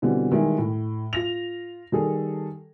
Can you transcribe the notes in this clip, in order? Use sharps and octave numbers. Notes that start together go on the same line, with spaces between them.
B2 D3 E3 G3 C4
D#3 E3 G3 G#3 E4
A2
F4 A#6 F7
D#3 G3 G#4 A4